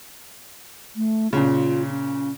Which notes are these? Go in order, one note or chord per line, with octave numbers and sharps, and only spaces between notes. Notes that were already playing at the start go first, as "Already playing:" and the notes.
A3
A#2 C#3 F4
C#4